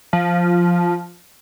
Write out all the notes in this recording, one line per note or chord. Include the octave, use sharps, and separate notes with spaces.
F3